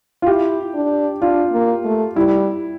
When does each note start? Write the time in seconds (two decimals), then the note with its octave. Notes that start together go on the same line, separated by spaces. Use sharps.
0.22 F4
0.26 E4 G4
0.75 D4
1.21 D4 F4
1.53 A#3
1.85 A3
2.16 G3 E4